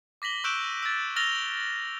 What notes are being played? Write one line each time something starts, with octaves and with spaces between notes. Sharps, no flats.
D6 A#6 B6 F#7 G7
C#6 E6 F#6 G6 D7 E7
E6 A6
E6 F6 A6 A#6 F7 G7